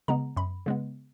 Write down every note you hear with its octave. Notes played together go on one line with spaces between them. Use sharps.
C#3 G#3 B3 A#5
F#2 B5
C#3 G#3 B3